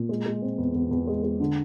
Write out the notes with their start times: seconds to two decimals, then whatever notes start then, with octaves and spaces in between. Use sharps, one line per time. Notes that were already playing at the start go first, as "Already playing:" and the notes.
Already playing: A#2
0.09 G#3
0.26 G#3
0.42 C4
0.58 E2
0.75 E2
0.91 E2
1.07 G#3
1.23 G#3
1.40 D3